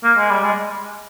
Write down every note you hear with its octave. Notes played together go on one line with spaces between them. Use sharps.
A#3
G#3
G3
G#3